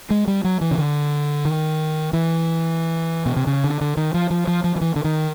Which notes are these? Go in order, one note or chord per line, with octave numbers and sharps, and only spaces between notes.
G#3
G3
F#3
E3
C#3
D3
D#3
E3
B2
C3
C#3
D3
D3
D#3
F3
F3
F3
F3
F3
E3
D3
D#3